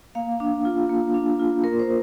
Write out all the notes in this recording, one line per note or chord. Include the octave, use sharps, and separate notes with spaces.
A#3 F5
D4
F4
A#3
D4
F4
A#3 A#4
C5